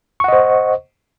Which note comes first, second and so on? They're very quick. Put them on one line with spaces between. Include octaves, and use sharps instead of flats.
C#6 F#5 D#5 C5